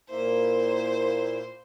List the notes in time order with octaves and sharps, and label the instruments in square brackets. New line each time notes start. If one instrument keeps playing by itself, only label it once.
[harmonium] A#2 A#3 E4 [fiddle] C5